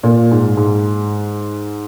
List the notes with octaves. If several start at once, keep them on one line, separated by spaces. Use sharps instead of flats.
A#2
G#2
G#2